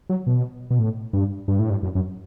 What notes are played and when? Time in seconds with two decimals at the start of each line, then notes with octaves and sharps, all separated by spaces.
0.09 F#3
0.27 B2
0.71 B2
0.79 A2
1.13 G2
1.48 G2
1.59 A2
1.71 G2
1.83 F#2
1.95 F#2